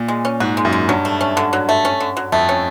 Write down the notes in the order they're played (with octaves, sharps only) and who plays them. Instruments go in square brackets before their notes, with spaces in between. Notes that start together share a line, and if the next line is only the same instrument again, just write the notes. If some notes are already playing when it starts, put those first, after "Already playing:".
Already playing: [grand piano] A#2
[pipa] G#3
C#4
[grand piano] G#2 [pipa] F#4
[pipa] G#3
[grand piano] F#2
[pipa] G#3
[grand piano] G2 [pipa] F#3
[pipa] A3
C#4
D3
F#3
A3
C#4
D3
F#3
[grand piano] F2 [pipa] A3
[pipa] C#4